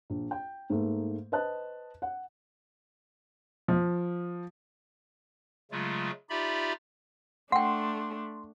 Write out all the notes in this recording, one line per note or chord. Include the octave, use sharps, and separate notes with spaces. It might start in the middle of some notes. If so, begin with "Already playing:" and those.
A#1
G5
G#2 A3 A#3
B4 C5 D#5 A5 F#6
F#5
F3
C#3 F#3 G#3 A3 F4
D#4 F4 G4 D5 E5 B5
A3 D4 F#5 G5 C6